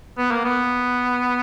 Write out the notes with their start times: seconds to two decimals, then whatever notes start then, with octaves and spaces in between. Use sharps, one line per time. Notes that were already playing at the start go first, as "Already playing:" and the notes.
0.18 B3
0.31 A#3
0.45 B3